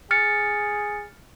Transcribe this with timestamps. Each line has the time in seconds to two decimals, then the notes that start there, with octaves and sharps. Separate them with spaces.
0.11 G#4 F6 A6 C#7